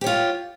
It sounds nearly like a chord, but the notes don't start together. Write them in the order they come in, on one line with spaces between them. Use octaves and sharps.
G4 C#5 F4